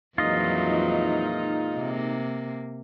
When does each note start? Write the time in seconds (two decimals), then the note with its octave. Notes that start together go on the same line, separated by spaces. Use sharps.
0.18 F2 A#2 E3 F#3 G#3 D#4 F4 D#5
1.75 C3 A#3